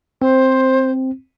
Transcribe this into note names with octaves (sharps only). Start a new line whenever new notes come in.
C4 C5